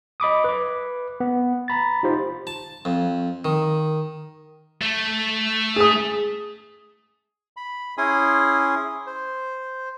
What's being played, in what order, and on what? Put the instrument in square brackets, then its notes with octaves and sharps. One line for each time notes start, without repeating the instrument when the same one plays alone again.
[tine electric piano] D#5 B5 D6 D#6
B4 D6
B3
A#5 B5 A6
D#4 F4 G4 C5
[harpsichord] A5
F2
D#3
[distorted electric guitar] A3
[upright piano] G#4 D#6
[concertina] B5
C#4 E4 G#4 G#5 C6 D#6
C5